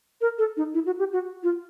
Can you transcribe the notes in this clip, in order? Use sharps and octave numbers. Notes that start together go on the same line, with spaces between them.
A#4
A4
D#4
E4
F#4
G4
F#4
F4